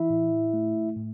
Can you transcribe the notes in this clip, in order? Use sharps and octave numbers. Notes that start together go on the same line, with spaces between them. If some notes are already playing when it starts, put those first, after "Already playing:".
Already playing: E3 E4 E5
A2
A3
A2